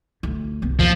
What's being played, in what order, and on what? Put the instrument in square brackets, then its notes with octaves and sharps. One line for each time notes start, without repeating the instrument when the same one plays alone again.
[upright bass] D2
C2 B3
[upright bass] D#2 [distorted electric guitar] F3